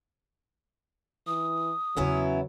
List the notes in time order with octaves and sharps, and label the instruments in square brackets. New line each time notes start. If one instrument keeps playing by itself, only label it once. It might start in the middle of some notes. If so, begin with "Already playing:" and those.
[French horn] E3 [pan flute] D#6
[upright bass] E2 C#3 [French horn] F#3 [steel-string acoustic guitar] B3 C#4 E4